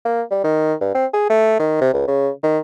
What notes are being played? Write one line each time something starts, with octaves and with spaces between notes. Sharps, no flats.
A#3
G3
D#3
G2
C4
G#4
A3
D#3
C3
C#2
C#3
D#3